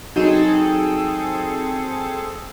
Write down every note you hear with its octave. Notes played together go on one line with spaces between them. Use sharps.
F#3 C4 D#4 F#4 G#4 A4